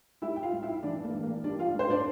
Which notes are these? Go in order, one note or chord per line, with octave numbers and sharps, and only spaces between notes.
G3 E4 E5
G5
F4 F5
G2
E4 E5
E3 D4 D5
A#3 A#4
G2
A#3 A#4
G3 D4 D5
F4 F5
G2 C5
D4 D5